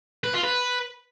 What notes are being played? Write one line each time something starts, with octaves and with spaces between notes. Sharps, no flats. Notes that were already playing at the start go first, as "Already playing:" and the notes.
B4
F4
B4